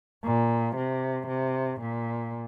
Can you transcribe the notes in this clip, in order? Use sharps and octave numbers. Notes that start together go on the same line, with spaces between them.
A#2
C3
C3
A#2